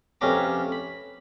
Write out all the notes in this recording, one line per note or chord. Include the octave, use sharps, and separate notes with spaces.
F2 C3 C#4 B4 A#5 D6
B5